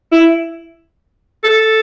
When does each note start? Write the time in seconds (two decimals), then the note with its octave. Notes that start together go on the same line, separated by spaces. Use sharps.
0.12 E4
1.44 A4